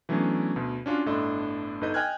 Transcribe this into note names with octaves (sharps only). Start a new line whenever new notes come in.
E3 F#3 A3 B3 C#4 D4
D2 B2
C#4 D4 F4 F#4
G1 A2 D4 A4 D#5 C6
G1 D#4 A4 B4 D#5 G6
D#5 G5 G#5 F6 F#6 G#6